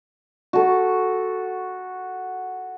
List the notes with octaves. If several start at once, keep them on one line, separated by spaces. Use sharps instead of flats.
F#4 A4